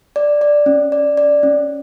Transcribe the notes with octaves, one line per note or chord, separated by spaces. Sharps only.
D5
D5
C#4
D5
D5
C#4